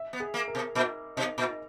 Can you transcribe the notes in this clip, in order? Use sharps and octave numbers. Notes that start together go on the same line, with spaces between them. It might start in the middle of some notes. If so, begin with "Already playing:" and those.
Already playing: E5
B3
G#4
A#3
A#4
B2
A#2 D#4
B2 D#4
A#2
D#4